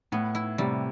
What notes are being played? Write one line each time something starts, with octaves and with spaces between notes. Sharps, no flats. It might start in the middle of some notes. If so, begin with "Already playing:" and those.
A2 B3
E4
A2 C3 G3